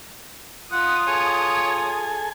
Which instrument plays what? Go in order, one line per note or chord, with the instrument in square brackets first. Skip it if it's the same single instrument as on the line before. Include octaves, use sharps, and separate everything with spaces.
[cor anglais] F4 [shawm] F#5 [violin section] D#6
[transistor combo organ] G#4 A4 G#5 [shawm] C#5